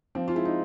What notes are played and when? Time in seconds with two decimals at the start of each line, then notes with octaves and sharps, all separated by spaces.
0.15 F3 C4
0.28 F4
0.35 G#3 E4
0.45 D#4